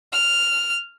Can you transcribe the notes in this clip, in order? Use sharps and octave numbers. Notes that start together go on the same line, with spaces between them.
F6